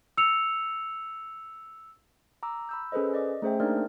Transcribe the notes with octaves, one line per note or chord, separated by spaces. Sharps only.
E6 C#7 F7
A#5 D6 E6
B5 E6 G6
C#4 G#4 A4 B4 C5 D#5
D5 D#5 D6
A3 C#4 G#4 C5 E5 G5
A#3 D4 D#4 A#4 D5 F6